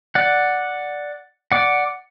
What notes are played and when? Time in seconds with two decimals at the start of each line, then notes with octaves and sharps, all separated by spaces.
0.15 D5 F#5
1.52 D5 F#5